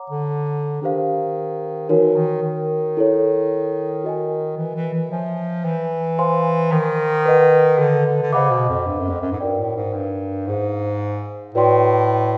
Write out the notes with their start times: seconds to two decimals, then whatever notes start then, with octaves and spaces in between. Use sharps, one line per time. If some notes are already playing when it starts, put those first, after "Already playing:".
Already playing: C#5 F#5 A#5 D6
0.10 D3
0.82 D#3 D4 G4 C5 F5
1.89 E3 D#4 F#4 A#4 C#5
2.16 D#3
2.43 D#3
2.97 E4 A4 C#5
4.04 F#4 A#4 D#5 G#5
4.57 E3
4.75 E3
4.93 E3
5.11 F3 C#5 E5 G#5
5.65 E3
6.19 C5 F5 G#5 C6
6.72 D#3
7.26 B4 D#5 F#5
7.79 D3
8.06 D3
8.22 D3
8.33 C#3 C5 D#5 F#5 B5 D6
8.51 B2
8.69 F2
8.87 G2
8.99 F#2
9.10 F2
9.22 F#2
9.32 G#2
9.40 G2 F#4 A#4 D5 G5
9.58 A2
9.76 G#2
9.94 G2
10.47 G#2 D#4 G#4 C5 F5
11.55 A2 F#4 B4 D5 G5 C6